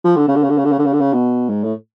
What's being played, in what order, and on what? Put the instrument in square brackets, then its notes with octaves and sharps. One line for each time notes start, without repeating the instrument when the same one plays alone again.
[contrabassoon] F3
D3
C#3
D3
C#3
D3
C#3
D3
C#3
D3
C#3
D3
C#3
B2
G#2
A2